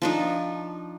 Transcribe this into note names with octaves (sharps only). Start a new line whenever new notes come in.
F3 D4 D#4